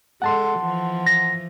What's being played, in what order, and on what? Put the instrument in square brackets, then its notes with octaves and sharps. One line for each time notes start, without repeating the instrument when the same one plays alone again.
[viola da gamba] G#3 A4 [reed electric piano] F#5 A5 C6
[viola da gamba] E3 F3
[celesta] A#6